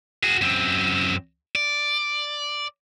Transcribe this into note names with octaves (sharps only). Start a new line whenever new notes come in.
F#4 G#4
F#2 C4
D5